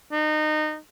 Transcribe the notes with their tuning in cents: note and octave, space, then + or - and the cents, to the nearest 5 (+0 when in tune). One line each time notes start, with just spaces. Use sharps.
D#4 -25